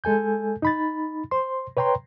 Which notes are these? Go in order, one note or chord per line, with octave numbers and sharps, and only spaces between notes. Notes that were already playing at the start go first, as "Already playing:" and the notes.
G#3 A4 G#5 G6
D#4 B5 A6
C5 C6
B4 C#5 G5 A#5 C6